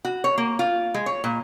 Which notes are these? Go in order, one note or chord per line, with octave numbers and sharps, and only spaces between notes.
F#4
C#5
A#3
F4
G#3
C#5
A#2